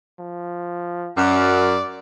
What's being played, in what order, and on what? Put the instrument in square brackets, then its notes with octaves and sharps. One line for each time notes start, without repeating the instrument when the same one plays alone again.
[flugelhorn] F3
[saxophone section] F#2 [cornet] D5 [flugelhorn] F#5